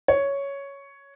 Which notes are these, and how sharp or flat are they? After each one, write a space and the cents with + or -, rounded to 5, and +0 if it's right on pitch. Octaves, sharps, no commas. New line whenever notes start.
C#5 +5